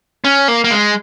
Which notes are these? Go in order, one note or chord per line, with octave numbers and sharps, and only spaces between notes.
C#4
A#3
A#3
G#3